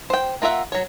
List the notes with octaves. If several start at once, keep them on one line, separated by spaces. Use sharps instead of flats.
C5 G5
A#3 F4 A#4 E5 F#5
F#3 C#5